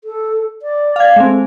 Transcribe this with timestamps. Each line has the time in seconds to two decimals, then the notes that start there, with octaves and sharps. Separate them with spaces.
0.04 A4
0.62 D5
0.96 F5 G#6
1.16 G#3 A3 C4